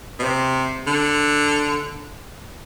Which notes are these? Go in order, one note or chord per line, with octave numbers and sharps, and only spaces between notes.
B2
C3
D3